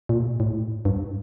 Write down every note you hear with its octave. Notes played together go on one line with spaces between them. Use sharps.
A#2
A2
G2